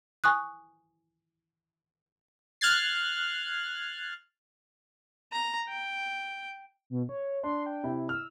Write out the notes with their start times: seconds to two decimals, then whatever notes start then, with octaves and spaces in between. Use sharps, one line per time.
0.24 G#5 C#6 D#6 F#6
2.61 F6 F#6 G#6 A6 C7
5.32 A#5
5.68 G5
6.90 B2
7.09 C#5
7.43 D4 C6
7.66 G5
7.84 C3 E4
8.09 E6 F6